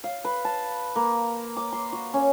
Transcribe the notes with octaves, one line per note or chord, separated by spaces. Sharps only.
F5
B4
A5
A#3
D6
C6
F#4
C#4